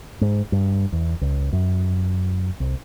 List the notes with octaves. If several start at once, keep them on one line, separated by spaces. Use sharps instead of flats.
G#2
G2
E2
C#2
F#2
C2